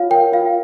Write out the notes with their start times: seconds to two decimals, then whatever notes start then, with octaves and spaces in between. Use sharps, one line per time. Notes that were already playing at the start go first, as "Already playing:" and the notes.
Already playing: F4 C#5 F5
0.10 A#4 G5
0.32 F4 F5